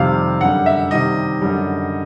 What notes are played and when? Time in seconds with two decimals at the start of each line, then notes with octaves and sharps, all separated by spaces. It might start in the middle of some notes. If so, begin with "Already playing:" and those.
Already playing: F2 C3 D#3 G3 F5
0.40 F#2 D3 G3 F#5
0.66 E5
0.91 C3 D#3 G3 D#5
1.41 F#2 D3 G3